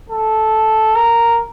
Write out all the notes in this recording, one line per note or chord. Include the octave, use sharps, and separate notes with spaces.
A4
A#4